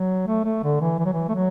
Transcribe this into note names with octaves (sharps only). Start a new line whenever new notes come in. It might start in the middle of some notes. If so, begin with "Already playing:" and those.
Already playing: F#3
A3
A3
D3
E3
E3
F#3
E3
A3
F#3